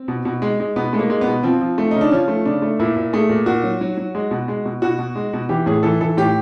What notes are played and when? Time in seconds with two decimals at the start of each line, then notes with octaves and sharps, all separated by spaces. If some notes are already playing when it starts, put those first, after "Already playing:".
Already playing: C4
0.08 B2
0.25 B2
0.42 G#3
0.60 G#3
0.76 B2 B3
0.93 G#3 A3
0.99 A#3
1.10 G#3
1.21 B3
1.28 B2
1.43 F3 C4
1.61 F3
1.78 A3
1.91 C#3 D#4
2.01 D4
2.11 F3 C#4
2.28 A3
2.45 C#3 D4
2.62 A3
2.79 A#2 E4
2.96 A#2
3.13 A3 G#4
3.29 A#2
3.46 A#2 F#4
3.63 F#3
3.81 F#3
3.97 F#3
4.15 G#3
4.31 B2
4.48 G#3
4.65 B2
4.82 B2 F#4
4.99 B2
5.16 G#3
5.33 B2
5.49 E3 G4
5.66 A2 G#4
5.83 E3 A4
6.01 E3 A4
6.17 A2 G4